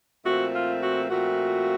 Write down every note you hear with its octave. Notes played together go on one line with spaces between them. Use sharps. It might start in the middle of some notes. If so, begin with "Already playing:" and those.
A#2 F3 A3 C4 F#4
F4
F#4
A#2 F3 A3 C4 F#4